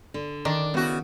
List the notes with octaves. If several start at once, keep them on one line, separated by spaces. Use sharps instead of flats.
D3
D#3 D4
C#3 B3 E4 F#4